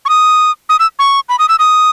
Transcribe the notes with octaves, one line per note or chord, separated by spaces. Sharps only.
C#6
D#6
D#6
E6
C#6
B5
D#6
E6
D#6